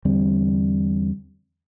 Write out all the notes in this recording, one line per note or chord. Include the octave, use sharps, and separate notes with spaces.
E2 D3 G3 C4